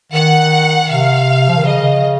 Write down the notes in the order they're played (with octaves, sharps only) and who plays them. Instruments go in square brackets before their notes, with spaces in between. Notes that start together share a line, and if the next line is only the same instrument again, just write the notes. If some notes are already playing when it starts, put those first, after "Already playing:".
[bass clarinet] D#3 [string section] F#5
[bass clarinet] C3 [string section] F5
[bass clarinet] F3
D#3
[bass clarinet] C#3 [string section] D#5